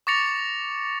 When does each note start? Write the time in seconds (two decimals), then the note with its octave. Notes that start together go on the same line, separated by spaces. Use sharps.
0.07 C#6 D6 A6 A#6 C#7 F7